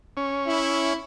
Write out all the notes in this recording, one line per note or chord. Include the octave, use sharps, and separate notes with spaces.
C#4
E4